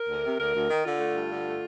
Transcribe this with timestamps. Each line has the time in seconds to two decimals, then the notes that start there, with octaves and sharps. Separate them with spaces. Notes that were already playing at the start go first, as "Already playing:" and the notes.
Already playing: A#4
0.09 D2
0.24 C3
0.38 D2 A#4
0.53 D2
0.69 D#3
0.84 D3 F4
0.99 A3
1.15 G2
1.30 D3
1.46 A3